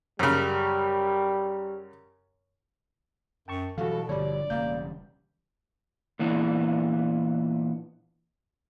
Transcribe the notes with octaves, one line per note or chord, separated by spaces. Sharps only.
F#2 C#3 G3
F#2 G5 A5 C#6
B2 E3 F#3 G3 F#4 A4 F5
G1 D3 F3 G3 C#5 D5
E1 C#3 G3 A#3 G6
A#2 E3 B3 D4